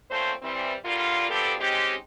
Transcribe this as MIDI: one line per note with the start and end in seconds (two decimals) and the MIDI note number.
0.10 0.32 46
0.10 0.32 57
0.10 0.32 60
0.10 0.32 61
0.10 0.32 72
0.42 0.73 52
0.42 0.73 55
0.42 0.73 60
0.85 1.26 50
0.85 1.26 55
0.85 1.26 58
0.85 1.26 65
1.30 1.53 53
1.30 1.53 59
1.30 1.53 60
1.30 1.53 62
1.30 1.53 67
1.30 1.53 69
1.60 1.94 56
1.60 1.94 60
1.60 1.94 61
1.60 1.94 63
1.60 1.94 67